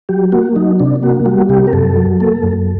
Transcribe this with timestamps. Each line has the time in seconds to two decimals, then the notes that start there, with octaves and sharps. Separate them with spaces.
0.09 F#3 G4
0.32 A#3 F#4
0.56 F#3 D#4
0.80 C3 D4
1.02 A#3 F#4
1.26 G3 F#4
1.49 C3 G4
1.67 A#4
1.73 F#2 A4
1.97 F#3
2.20 A#3 A4
2.43 F#2